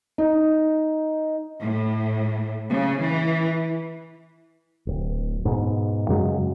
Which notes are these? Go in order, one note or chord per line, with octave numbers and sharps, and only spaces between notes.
D#4
A2
C#3
E3
D1
G#2 B2
F#2 C#3 F#3 G#3